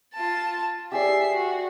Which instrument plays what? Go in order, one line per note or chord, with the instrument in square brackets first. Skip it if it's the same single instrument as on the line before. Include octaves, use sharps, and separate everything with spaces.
[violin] F4 A5
[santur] G4 G#4 D5 [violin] E5 C7
[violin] F#4